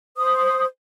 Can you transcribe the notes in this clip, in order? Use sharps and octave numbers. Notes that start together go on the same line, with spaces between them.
C5 D#6